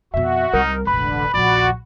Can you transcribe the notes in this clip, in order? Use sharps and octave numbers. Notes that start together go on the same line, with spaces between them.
F2 B2 F#4 E5
C2 G3 D#4 A#4
E1 A1 D3 B4 B5
A#1 D#2 F#4 D5